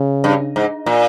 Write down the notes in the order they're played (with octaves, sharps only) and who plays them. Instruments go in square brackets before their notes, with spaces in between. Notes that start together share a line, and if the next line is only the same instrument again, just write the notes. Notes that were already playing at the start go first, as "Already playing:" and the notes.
Already playing: [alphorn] C#3
[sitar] G2
G#2
A#2